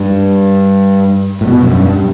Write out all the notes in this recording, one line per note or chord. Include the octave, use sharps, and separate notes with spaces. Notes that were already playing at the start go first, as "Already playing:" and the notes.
Already playing: G2
A2
B2
F#2
G2